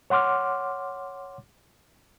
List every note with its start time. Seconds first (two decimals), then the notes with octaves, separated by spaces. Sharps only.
0.10 C#5 F#5 C6 D6 F6